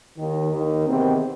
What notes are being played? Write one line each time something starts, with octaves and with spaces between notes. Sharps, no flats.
D#2 D#3
D#2 D#3
E2 C3 D#3 C4